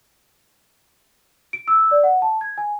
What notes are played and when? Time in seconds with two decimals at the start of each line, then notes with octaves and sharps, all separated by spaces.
1.53 D7
1.68 E6
1.91 D5
2.03 F#5
2.22 A5
2.41 G#6
2.58 G#5